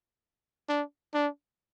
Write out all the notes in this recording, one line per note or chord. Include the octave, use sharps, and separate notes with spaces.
D4
D4